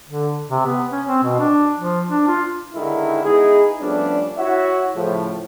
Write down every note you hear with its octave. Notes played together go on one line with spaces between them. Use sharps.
D3
C3
B3
C#4
C4
B2
D4
F3
D4
F4
D3 D#3 G#3 E4
G#3 B3 D#4 E4 G#4
F3 G3 A3 B3 C#4 D4
E4 F#4 C#5 E5 F#5
A2 C#3 F3